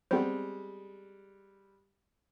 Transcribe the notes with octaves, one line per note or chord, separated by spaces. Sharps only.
G3 G#3 B3 C4 C5